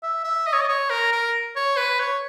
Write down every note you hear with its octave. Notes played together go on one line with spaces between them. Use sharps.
E5
E5
D#5
C#5
D#5
C#5
A#4
A#4
C#5
B4
C#5